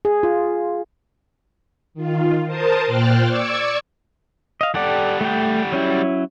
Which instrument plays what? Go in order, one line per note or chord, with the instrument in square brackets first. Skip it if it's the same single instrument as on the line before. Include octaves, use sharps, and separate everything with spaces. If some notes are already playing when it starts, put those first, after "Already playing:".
[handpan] G#4
F4
[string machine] D#3 F4
A#4 C5 A5 D#6
A#2 C5 G5 F6 F#6 A6
D5 C#6 D6 E6 G#6 C#7
[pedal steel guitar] D#5 F5
[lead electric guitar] G3 F#5 [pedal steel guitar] G4 A4 D5
[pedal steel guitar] A3 G5
F#3 C#4 E4